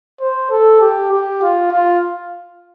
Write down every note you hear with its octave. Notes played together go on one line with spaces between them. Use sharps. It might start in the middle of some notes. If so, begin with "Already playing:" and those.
C5
A4
G4
G4
F4
F4